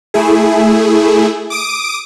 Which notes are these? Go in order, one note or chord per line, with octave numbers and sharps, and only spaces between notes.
A3 E4 G#4
D6 D#6 D7